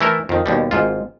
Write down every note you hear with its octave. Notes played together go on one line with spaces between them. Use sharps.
E3 A3 E4 A4 A#4
F2 D#3
D#2 B2 G3
G#1 G#2 F4